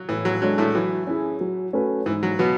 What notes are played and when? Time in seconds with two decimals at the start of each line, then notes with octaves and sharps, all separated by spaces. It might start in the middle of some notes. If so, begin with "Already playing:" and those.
Already playing: F#3
0.09 A2 E3
0.25 F#3
0.42 F#3 G#3 D4 A4 C#5
0.58 A2 A3
0.75 E3 F#3
1.07 C#4 E4 G#4
1.41 F#3
1.73 A3 C#4 F#4 B4
2.06 G#2 E3
2.23 F#3
2.39 B2 F#3 B3